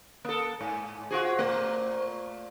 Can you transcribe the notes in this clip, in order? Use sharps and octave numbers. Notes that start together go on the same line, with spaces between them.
A#3 A4 D#6
G#2 G#5
F4 F#4 G#4 C5
A#2 A3